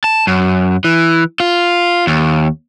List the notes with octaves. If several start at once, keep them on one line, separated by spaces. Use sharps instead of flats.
A5
F#2
E3
F4
D#2